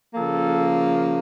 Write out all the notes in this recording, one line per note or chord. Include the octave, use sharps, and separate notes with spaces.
C#3 F3 A#3 A4